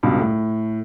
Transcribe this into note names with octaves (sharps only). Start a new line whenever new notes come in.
C#2 G2 B2
A2